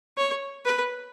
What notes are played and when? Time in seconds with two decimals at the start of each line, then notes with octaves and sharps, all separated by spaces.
0.17 C#5
0.65 B4